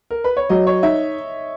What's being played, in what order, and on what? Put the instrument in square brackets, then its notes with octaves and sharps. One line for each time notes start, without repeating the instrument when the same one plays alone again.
[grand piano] A#4
B4
C#5
[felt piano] F#3 [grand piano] D#5
[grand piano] C#5
[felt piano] D#4 [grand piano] E5